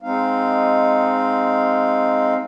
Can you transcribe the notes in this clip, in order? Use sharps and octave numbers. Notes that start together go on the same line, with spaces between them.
G#3 C4 D#4 F5